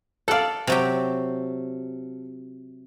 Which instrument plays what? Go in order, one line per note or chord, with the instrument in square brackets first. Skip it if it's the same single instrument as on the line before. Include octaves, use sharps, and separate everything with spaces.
[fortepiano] A4 F5 [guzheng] D5 F#5
[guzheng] C3 F#3 G4